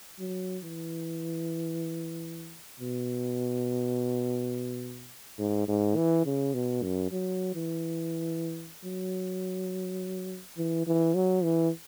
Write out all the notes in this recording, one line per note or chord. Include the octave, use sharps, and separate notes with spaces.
F#3
E3
B2
G#2
G#2
E3
C#3
B2
F#2
F#3
E3
F#3
E3
E3
F#3
E3